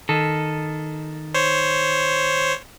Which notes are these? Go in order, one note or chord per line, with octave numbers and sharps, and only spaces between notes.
D#3 A4
C5 C#5